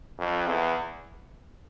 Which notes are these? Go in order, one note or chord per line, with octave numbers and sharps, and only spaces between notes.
F2
E2